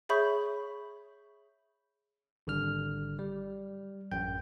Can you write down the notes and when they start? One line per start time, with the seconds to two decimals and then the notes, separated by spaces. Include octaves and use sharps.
0.09 G#4 C#5 E5 B5 C#6 G6
2.47 G#1 D3 G3 F6
3.19 G3
4.11 A1 F#2 G5 G6